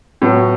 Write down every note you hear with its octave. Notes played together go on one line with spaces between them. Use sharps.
A2 F#3 B3